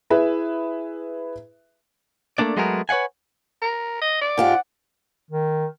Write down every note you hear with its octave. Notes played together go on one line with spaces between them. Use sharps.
E4 G#4 B4 E5
A3 A#3 C#4 D4 D5
F#3 G#3 A3 B3 G#4 A#4
B4 C#5 F5 F#5 G#5
A#4
D#5
D5
G#2 F4 G4 F#5
D#3